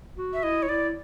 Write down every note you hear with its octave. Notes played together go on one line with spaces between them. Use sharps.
F#4
E5
E4 D#5
C#5
E4 D5